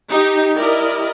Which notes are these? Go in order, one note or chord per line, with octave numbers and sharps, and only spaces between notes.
D#4 G4
E4 G4 A#4 D5 D#5